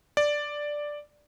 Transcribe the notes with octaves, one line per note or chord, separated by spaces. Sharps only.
D5